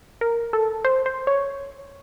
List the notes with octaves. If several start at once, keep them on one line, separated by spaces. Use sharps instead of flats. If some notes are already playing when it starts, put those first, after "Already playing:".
A#4
A4
C5
C5
C#5